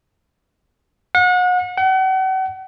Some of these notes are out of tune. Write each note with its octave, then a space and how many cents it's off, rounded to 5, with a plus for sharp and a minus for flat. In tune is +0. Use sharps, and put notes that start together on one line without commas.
F#5 -35
F#5 +40